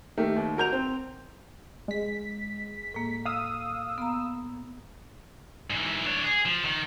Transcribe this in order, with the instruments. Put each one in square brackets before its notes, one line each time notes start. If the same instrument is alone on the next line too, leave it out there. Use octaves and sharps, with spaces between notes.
[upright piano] D#3 A3 A#3 G4
D#2
F#4 A#4 G6 F7
C4
[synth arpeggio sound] G#3 B6
[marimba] A2 A#3
[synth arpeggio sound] F5 D#6 E6
[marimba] B3 A#5
[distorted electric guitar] G#2 E3
D4 C#5
G#4
F3
D#3